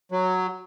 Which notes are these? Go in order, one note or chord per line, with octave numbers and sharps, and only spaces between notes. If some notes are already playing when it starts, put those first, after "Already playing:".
F#3